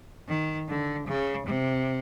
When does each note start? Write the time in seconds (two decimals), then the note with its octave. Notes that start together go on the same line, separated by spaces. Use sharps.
0.28 D#3
0.69 D3
1.08 C#3
1.46 C3